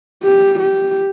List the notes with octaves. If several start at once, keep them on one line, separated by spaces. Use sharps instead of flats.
G4
G4